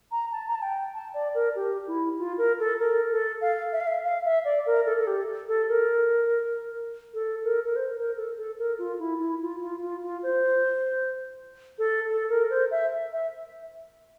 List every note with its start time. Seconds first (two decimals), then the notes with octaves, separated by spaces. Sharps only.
0.12 A#5
0.32 A5
0.48 A#5
0.55 A5
0.62 G5
0.95 A5
1.14 D5
1.35 A#4
1.56 G4
1.87 E4
2.18 F4
2.38 A#4
2.60 A4
2.79 A#4
3.11 A4
3.41 F5
3.72 E5
3.80 F5
3.87 E5
4.04 F5
4.25 E5
4.45 D5
4.66 A#4
4.86 A4
4.98 A4
5.07 G4
5.48 A4
5.69 A#4
7.14 A4
7.44 A#4
7.64 A#4
7.76 C5
7.97 A#4
8.17 A4
8.37 A4
8.59 A#4
8.79 F4
8.99 E4
9.20 E4
9.41 F4
9.62 F4
9.82 F4
10.03 F4
10.23 C5
11.79 A4
12.09 A4
12.29 A#4
12.50 C5
12.71 E5
13.13 E5